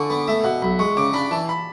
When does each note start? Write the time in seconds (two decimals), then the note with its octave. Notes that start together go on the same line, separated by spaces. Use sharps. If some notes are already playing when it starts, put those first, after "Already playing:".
Already playing: D3 G#5 A5 C#6 D6
0.09 B3 B5
0.27 A3 E5
0.44 B2 F#5
0.62 B1 B5
0.79 G#3 C#6
0.97 C#3 D6
1.13 D4 B5
1.31 E3 A5
1.49 B5